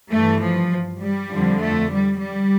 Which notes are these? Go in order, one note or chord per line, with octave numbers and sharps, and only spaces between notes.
G2 E3 A3
F3
G3
F2 D3 F3
A3
G3
G3